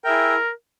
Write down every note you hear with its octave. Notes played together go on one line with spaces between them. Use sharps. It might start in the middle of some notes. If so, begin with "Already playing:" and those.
E4 G#4 A#4 E5 G5